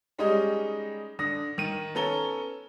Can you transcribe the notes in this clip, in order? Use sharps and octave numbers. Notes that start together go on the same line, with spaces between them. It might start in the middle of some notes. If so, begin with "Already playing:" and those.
G3 G#3 C#4 D#4 D#5
D3 D#6 A#6
D#3 D#7
B3 C#4 A4 A#5 G7